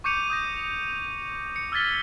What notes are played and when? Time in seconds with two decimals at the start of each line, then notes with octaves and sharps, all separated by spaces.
0.04 C#6 D6 G6 C#7 D#7 F7
0.30 D#6 G6 A#6
1.56 C#7
1.72 E6 F6 G#6 A6 B6 G7